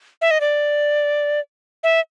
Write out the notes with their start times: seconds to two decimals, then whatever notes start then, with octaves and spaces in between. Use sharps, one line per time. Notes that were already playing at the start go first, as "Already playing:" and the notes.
0.22 E5
0.31 D#5
0.41 D5
1.84 E5